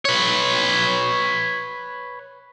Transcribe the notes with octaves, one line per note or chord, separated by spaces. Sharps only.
B4 C#5